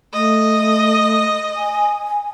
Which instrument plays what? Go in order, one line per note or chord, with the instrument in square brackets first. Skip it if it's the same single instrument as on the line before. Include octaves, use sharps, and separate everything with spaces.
[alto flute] A3 [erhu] D#5
[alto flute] G#5